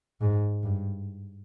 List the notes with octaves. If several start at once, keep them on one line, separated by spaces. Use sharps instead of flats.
G#2
G2